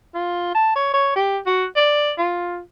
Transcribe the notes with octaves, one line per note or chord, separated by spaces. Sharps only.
F4
A5
C#5
C#5
G4
F#4
D5
F4